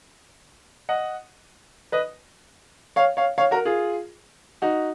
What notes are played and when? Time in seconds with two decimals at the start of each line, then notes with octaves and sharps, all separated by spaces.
0.89 D#5 F#5
1.92 B4 D#5
2.96 C#5 F5
3.17 C#5 F5
3.38 C#5 F5
3.51 F#4 A#4
3.65 F4 G#4
4.62 D#4 F#4